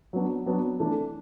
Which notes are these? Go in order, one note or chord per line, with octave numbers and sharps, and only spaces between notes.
F#3 B3 D4
F#3 B3 D4
E3 A3 D4